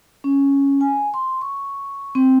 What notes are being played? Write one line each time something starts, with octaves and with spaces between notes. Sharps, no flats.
C#4
G#5
C6
C#6
C4